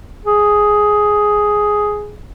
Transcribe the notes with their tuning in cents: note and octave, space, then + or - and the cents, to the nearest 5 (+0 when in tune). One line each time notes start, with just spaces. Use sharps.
G#4 +5